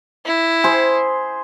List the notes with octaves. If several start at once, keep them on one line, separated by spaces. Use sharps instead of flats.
E4
G#4 C5